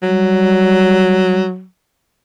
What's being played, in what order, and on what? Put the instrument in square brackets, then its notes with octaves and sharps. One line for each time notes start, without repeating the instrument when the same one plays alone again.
[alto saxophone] F#3 [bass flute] G3